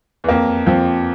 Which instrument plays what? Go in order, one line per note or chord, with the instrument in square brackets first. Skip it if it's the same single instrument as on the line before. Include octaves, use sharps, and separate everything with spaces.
[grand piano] E2
[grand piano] F2 [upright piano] A#3
[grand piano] F2 [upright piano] F3